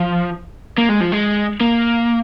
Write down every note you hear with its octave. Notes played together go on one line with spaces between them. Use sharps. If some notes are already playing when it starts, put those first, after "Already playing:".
Already playing: F3
A#3
G#3
F3
G#3
A#3